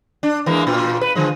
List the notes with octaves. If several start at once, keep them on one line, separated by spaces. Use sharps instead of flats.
D4
E3 G#3 A#3
A#2 F4 B4
B4
D3 F3 G#3